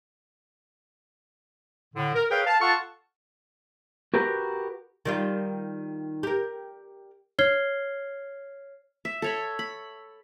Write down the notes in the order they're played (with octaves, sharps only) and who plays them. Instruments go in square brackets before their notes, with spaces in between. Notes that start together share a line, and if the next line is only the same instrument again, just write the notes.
[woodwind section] A2 D3
A#4
G#4 A#4 B4 C#5 F5 G5
F5 A5
F4 A4 F5 F#5 A5 C#6
[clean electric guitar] F#4 G4 A#4 B4
[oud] D#3 G3 F4
G4 A#4
[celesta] C#5 F6 G#6 C7 G7
[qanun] E5
A4 C#5 B5
B5